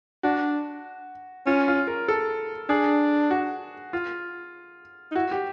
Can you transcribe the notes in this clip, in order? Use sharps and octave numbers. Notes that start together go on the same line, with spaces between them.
D4 F#4
C#4 F4
F4
A#4
A4
D4 G#4
F#4
F4
D#4
E4 F#4
G4